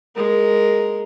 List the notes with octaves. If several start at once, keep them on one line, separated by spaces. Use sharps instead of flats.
G#3 A#4